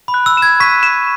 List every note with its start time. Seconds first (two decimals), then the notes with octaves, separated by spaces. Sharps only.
0.08 B5
0.14 F#6
0.26 E6
0.37 E7
0.42 G#6
0.60 C#6 B6
0.83 E7